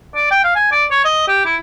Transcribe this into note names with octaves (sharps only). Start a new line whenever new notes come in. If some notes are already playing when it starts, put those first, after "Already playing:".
D5
G5
F5
G#5
D5
C#5
D#5
G4
E4